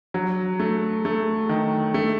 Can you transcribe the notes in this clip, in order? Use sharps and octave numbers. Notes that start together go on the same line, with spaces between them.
F#3
A3
A3
D#3
A3